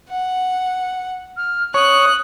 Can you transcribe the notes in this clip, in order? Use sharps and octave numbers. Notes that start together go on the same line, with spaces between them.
F#5
F6
C#5 D#6 F#6